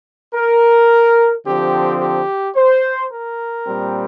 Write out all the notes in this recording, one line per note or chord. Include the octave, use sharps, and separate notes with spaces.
A#4
D3 F3 C4 G4
G4
C5
A#4
A#2 G3 C4